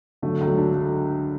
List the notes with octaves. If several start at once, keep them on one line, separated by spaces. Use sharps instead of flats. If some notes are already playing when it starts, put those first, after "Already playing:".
D3 F#3 A3
C#2
F#3 A3
D4